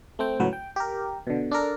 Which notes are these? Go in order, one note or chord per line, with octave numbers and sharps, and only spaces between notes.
A3 C4 G5
C#2 A2 F#3 B4
G5
G4 A#4
B2 D3
D4 A4 A#4